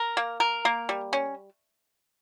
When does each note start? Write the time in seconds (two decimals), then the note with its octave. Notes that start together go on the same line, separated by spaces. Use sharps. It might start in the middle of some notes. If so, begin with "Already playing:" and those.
Already playing: A#4
0.17 A#3
0.40 A#4
0.65 A#3
0.89 G3
1.13 C#4